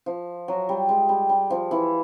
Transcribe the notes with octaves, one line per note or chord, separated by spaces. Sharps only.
F3
F#3
G3
G#3
G3
G3
F3
E3